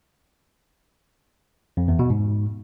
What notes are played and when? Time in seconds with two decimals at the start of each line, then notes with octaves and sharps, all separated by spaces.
1.77 F2
1.88 E2
1.99 B2
2.10 G#2